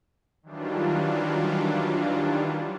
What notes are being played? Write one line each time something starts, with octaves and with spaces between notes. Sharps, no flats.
D#3 E3 F#3 G3 D4 F4